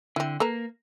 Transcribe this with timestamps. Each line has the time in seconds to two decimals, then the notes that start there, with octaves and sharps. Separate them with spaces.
0.16 D3 C4 E4
0.40 A#3 A4 B4 A#5